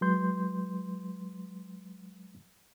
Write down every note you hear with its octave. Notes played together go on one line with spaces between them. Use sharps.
F#3 G#3 B4 C6 G6